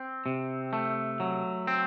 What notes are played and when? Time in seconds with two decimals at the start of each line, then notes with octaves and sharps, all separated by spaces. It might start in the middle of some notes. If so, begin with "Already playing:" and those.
Already playing: C4
0.26 C3
0.73 A3
1.20 F#3
1.67 C4